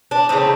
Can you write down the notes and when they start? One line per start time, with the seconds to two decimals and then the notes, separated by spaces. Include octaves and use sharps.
0.11 D4
0.29 C#3 E3 A3 C4 D#4